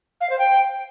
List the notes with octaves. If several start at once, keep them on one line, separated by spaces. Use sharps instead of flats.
F5
C5
G5